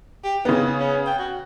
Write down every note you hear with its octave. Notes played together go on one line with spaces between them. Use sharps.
G4
C#3 B3 D#4
C#4
G5
F#4